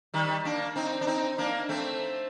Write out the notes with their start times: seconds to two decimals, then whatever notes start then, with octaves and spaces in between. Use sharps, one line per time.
0.14 D#3 G3
0.45 A#3 D4
0.76 C4 D#4
1.01 D4
1.07 C4 D#4
1.38 A#3 D4
1.69 A3 C4